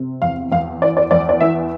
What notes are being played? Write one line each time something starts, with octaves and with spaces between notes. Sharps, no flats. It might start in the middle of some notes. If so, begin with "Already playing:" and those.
Already playing: C3
E2 F5
E2 F5
E3 D5
D5
E2 D5
D5
E3 E5